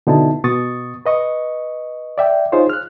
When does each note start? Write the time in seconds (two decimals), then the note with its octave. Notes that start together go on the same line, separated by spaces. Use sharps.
0.07 B2 D3 D#4 E4 A5
0.44 B2 C#6 D#6 A6
1.06 B4 D#5 C#6
2.18 D5 E5 G5
2.52 D#4 F4 G#4 C5 C#5
2.70 F6 F#6